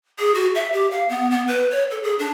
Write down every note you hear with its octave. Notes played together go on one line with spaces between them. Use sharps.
G#4
F#4
E5
G4
F5
B3
B3
B4
C#5
A4
G#4
D4